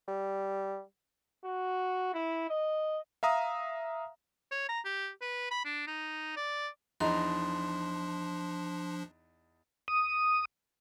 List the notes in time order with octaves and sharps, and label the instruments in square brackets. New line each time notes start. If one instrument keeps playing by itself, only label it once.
[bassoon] G3
[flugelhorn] F#4
E4
D#5
[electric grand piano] E5 F5 A#5 D#6
[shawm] C#5
A#5
G4
B4
B5
D4
D#4
D5
[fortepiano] E2 D#4 A#5 [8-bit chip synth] F3 D4 [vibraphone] C6
[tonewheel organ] D#6